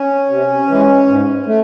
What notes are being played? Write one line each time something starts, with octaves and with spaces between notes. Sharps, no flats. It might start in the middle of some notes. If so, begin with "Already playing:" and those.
Already playing: C#4
C3
E3 G#3
G#2
A3